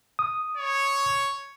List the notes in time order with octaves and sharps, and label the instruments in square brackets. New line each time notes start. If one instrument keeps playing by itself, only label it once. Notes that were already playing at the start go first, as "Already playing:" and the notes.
[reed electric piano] D#6
[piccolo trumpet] C#5